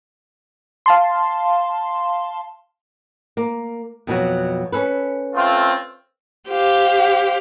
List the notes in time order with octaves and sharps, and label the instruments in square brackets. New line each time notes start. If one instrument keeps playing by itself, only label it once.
[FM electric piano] F5 A5 C6
[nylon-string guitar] A#3
F2 B2 F#3
C#4 A4 B4
[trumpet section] A3 C4 F4
[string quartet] G4 C5 F5